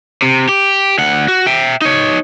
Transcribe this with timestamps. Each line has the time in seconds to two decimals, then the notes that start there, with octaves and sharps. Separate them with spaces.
0.22 C3
0.49 G4
0.98 D2 F#5
1.28 F#4
1.47 E5 G5
1.82 D#4 C#5